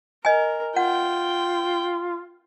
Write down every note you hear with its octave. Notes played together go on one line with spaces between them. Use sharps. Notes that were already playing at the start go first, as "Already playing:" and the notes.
A#4 D#5 G#5
F4 F#5 G5